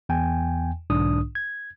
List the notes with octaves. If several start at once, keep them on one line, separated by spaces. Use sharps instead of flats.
E2 G5 G#5
B1 G#2 D3 D4 D#6
G#6